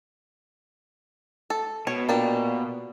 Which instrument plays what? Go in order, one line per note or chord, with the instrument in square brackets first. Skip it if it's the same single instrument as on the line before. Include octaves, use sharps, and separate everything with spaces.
[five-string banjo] A4
[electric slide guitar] B2 [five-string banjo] C#5
[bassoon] A#2 [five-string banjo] A#3 D4 G4